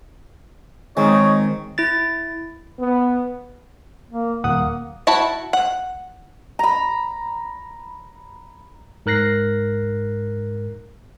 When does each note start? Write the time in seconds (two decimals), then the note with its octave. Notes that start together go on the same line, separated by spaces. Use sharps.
0.97 D#3 G#3 C4 D#4 C#5
1.78 E4 A6
2.79 B3
4.11 A#3
4.44 D#1 A#3 F#5 D#6
5.07 E4 F#4 A5 B5
5.53 F#5
6.59 A#5 B5
9.06 G#2 A#4 F#6 A#6 C7